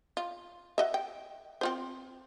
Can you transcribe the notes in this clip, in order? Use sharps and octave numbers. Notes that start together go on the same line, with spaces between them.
F4
F#4 D#5 E5
G5
C4 F4 C5